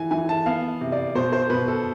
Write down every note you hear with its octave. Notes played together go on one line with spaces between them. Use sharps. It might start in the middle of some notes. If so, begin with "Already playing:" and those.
Already playing: E3 G#5
E3 G#5
A5
B3 F5
C3
D5
B2 C5
C5
B2 B4
A4